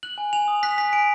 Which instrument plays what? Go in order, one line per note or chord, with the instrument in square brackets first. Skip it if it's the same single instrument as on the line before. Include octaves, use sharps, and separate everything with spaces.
[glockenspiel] F#6 F#7
G#5
G#5 F7
D#6
F#6 B6
G#5 B6
G#5 D7